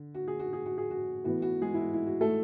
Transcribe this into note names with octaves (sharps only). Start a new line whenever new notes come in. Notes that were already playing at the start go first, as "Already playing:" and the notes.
Already playing: D3
F#4
G#4
F#4
G#4
F#4
G#4
F#4
A2 E3 B3 F#4
F#4
G#3 G#4
E4
F#4
E4
F#4
A3 A4